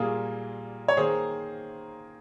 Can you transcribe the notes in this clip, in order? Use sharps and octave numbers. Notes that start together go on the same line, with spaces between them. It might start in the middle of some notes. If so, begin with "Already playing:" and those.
Already playing: A#2 G3 A#3 F4 G#4
C#5
D#3 A#3 G#4 C5